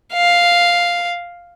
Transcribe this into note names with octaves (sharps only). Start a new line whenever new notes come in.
F5